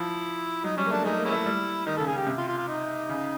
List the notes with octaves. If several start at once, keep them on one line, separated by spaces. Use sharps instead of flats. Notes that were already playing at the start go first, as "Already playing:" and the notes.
Already playing: F3 E4
F#3 D#4
G3 C#4
A#3
A3 D4
G#3 A3 D#4
A#3
G#3 C#4 E4
A3
G3
D#3 D#4
C#3 A4
G#4
C#3 G4
C3
F4
F4
F4
D#4
C#3